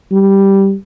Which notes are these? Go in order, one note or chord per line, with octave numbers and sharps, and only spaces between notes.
G3